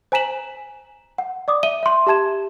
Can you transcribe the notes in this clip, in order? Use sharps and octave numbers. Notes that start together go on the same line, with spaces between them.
C5 G#5 A#5 B6 E7 F#7
F#5
D5 D6 D#6
E5 D#7 G7
E5 C6
G4 E5 A5 G#6 E7